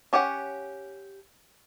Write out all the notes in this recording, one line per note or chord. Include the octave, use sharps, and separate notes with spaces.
C#4 G4 C#5 F#5